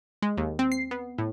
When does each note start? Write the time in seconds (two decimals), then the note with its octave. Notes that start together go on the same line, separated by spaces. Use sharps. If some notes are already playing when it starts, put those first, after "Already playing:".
0.22 G#3
0.37 D#2
0.59 C4
0.72 C7
0.91 B3
1.18 A2